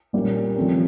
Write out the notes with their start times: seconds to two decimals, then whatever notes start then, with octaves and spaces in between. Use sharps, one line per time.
0.13 A#2 G3 A#3 C#4
0.56 F3 A3 C4